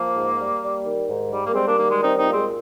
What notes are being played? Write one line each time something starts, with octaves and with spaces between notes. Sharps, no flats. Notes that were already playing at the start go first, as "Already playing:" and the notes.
Already playing: F3 A#3
G#2
G3
G3
D#3
G#2
G3
A#3
G3 G#3 C4
A#3 D4
D#3 A#3
G#3
G3 C4 D#4
C4 D#4
A#2 A#3
G#3 C4